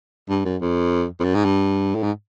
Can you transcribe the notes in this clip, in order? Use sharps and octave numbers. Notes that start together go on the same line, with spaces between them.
G2
F#2
F2
F2
F#2
G#2
G2
A2
G#2